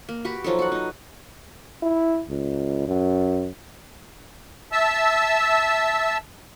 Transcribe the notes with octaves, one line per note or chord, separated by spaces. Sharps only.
A#3
F#4 G4 B4
F3 F#3 D#4 A4
F#4 F#5
D#4 D#5
E4
C#2
F#2
E5 A5 E6